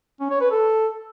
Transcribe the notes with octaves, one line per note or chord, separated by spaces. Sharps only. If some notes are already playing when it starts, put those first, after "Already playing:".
C#4
C#5
B4
A4